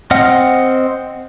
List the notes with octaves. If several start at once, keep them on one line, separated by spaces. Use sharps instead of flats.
C4 D#5 F#5 F6